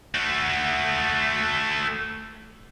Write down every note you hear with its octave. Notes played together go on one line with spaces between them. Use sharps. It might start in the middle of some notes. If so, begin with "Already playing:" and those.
A3 F#4